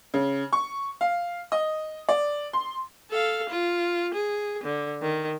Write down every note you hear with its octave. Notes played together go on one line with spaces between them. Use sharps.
C#3
C#6
F5
D#5
D5
C6
A4 F5
F4
G#4
D3
D#3